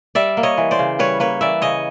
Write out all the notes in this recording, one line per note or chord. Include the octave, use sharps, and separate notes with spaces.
G3 D5 E5
A#3
C#5 D#5
E3
C5 D5
C#3
G3 B4 C#5
A#3 B4 C#5
E3 D5 E5
C#3 C#5 D#5